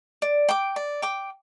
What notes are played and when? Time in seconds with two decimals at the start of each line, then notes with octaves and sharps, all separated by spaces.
0.22 D5
0.49 G5 D6
0.76 D5
1.02 G5 D6